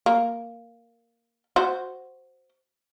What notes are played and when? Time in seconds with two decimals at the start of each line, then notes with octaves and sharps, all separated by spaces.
0.06 A#3
1.56 F#4 C5